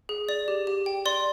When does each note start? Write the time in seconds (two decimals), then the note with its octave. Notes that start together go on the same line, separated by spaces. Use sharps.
0.09 G#4
0.29 D5
0.48 G4
0.67 G4
0.86 G5
1.06 D5 C6